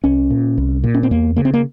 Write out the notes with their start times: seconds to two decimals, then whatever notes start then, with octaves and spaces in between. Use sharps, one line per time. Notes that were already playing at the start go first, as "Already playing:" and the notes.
0.04 C2 C#4
0.30 A#2
0.58 C2
0.84 A#2
0.94 C#4
1.03 C4
1.11 E2 A#3
1.37 C#3 A#3
1.45 C4
1.54 A#3